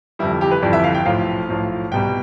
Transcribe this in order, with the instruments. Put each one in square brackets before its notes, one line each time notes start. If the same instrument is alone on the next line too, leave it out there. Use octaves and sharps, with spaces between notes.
[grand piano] G1 F2 E3 G3 E4
G4
B4
G1 F2 E3 G3 D5
E5
F5
G5
B1 A2 F3 F5
B1 A2 F3
C2 B2 G3 G5